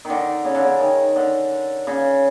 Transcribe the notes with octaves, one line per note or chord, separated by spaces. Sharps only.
D#3
D3
C#3
D3
C#3
D#3
D3
C#3